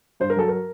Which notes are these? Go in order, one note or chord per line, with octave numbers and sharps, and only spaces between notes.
G2 C5
A#4
F#3 A4
A#4